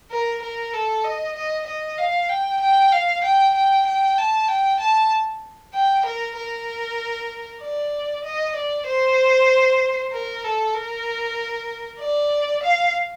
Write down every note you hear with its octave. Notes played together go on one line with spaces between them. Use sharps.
A#4
A#4
A4
D#5
D#5
D#5
F5
G5
G5
F5
G5
G5
G5
A5
G5
A5
G5
A#4
A#4
D5
D#5
D5
C5
A#4
A4
A#4
D5
F5